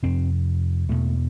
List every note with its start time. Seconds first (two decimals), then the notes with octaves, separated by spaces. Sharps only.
0.03 F2 C3 C4
0.89 E2 B2 A3